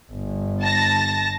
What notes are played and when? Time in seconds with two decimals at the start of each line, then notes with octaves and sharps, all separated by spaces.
0.12 G1
0.61 A5 A#6